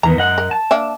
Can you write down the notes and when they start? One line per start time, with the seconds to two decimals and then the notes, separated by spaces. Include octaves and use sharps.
0.03 E2 D#3 B3 A#5
0.17 F#2 D#5 F#5
0.38 A#4
0.51 A5
0.71 A#3 D4 E5